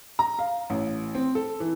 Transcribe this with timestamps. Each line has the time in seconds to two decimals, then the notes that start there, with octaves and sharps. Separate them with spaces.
0.19 A#5
0.39 F5
0.70 A1
1.15 C4
1.35 A4
1.60 E3